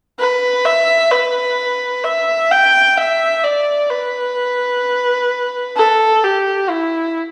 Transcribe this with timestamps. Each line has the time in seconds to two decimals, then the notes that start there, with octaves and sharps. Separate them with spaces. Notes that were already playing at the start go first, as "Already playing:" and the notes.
0.19 B4
0.65 E5
1.11 B4
2.04 E5
2.51 G5
2.97 E5
3.44 D5
3.90 B4
5.77 A4
6.24 G4
6.70 E4